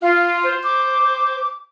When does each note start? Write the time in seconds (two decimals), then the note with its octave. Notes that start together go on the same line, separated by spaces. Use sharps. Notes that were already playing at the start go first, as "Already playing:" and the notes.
0.02 F4 F5
0.43 C5
0.64 D6